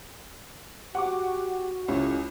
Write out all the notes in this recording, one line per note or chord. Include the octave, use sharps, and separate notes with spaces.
F#4 G4 F#5 C#6 D6
C#2 A2 C#4 E4 F4 G4